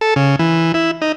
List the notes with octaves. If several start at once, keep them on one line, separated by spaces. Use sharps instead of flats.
A4
C#3
E3
E4
D#4